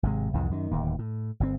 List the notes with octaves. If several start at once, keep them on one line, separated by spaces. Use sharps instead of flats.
G#1 C3 G#3
C2 F2 G#2 E3
F#2 D#3
D1 D#2
A2
G1 C3 C4